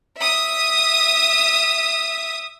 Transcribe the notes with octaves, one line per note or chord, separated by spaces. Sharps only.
E5 D#6